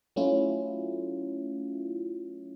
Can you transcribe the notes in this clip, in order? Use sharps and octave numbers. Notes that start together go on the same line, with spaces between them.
F#3 A3 C#4 E4 F4